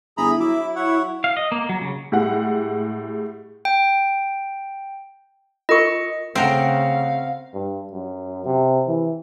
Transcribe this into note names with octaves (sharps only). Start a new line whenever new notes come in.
G1 E4 G#4 A#5 B5
F#3 E5 D6
C#5 F#5
F5
D#5
A#3
F#3
C#3
A2 G3 G#3 F#5
G5
F4 A#4 D#5 C#6 C#7
C#3 A3 C4 A#4 F5 F#5
G2
F#2
C3
E3